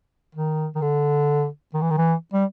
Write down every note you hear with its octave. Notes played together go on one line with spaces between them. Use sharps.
D#3
D#3
D3
D#3
E3
D#3
E3
G3